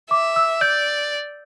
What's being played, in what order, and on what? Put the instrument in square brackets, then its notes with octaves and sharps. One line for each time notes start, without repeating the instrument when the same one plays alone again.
[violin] E5 [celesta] D6
[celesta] E6
[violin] D5 [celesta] G6